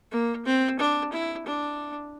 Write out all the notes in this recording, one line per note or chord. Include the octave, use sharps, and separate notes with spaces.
A#3
C4
D4
E4
D4